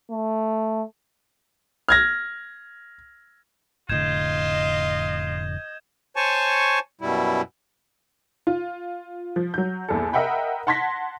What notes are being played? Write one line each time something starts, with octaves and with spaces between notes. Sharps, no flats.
A3
F6 G#6 A#6
F1 A2 D3 F4 D#5 G6 G#6 E7
C5 C#5 G#5 A5 C#6
F#2 B2 G3 E4
F4
F3
F#3 G6
A#1 E2 A4
A#4 D#5 E5 F#5 G5 B5
F#5 A5 C6 G#6 A#6 B6